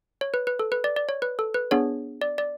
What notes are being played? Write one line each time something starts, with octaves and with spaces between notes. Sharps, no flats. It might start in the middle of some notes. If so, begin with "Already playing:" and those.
C#5
B4
B4
A4
B4
D5
D5
C#5
B4
A4
B4
B3 D4 G#4 C#5
D5
D5